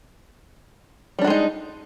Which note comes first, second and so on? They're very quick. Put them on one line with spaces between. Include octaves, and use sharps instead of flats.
G3 D4 F#4 G#3 D#4